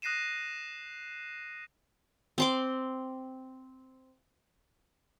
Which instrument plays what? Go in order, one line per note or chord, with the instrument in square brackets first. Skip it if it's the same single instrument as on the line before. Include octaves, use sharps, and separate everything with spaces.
[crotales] D#6 F#6 A#6 C7 D#7 E7
[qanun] C4 C6 D6